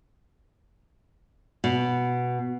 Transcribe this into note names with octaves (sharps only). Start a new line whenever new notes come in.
B2